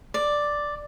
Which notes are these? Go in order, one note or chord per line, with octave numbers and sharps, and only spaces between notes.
D5